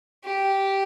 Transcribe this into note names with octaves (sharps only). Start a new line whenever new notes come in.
G4